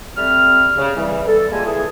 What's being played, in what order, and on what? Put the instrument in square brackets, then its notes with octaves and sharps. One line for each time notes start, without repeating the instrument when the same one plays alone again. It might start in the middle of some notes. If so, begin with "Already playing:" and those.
[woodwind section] G3 A3 C4 F6
C#3
E3 G3
A4
G3 G#3 A#3 F4 G#5 A5
E3 G#4